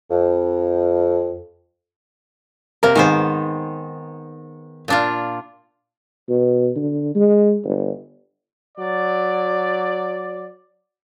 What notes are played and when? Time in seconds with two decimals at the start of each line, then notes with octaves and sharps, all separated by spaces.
0.10 F2
2.83 C3 A#3 A#4
2.95 G#2 D#3 B3 C5
4.88 A#2 D4 F4
6.29 B2
6.76 D3
7.15 G#3
7.64 G1
8.78 F#3 D5